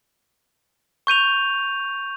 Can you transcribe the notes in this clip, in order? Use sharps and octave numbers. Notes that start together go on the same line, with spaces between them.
C#6 G6 D#7 F7